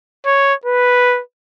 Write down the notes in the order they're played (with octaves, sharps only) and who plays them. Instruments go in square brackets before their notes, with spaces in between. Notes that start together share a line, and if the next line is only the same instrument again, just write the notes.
[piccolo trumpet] C#5
B4